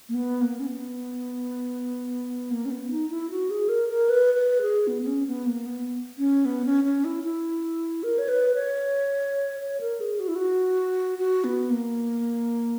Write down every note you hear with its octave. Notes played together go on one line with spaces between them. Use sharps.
A#3
B3
A#3
C#4
B3
A#3
C#4
B3
D#4
E4
F#4
G#4
A#4
A#4
B4
B4
G#4
B3
B3
C#4
B3
A#3
B3
C#4
B3
C#4
C#4
E4
E4
A#4
C#5
B4
C#5
C#5
A#4
G#4
F#4
E4
F#4
F#4
B3
A#3